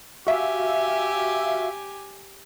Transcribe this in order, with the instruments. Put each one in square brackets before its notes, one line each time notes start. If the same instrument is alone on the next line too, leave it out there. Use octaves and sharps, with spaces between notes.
[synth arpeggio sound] F#4 E5 F5 [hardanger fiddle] G4 G#5